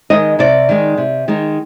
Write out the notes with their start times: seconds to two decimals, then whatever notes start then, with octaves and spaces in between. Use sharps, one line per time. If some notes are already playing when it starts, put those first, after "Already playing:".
0.10 D#3 G#3 D#4 D#5
0.39 C3 D5
0.69 D#3 G#3 D#4
0.98 C3
1.28 D#3 G#3 D#4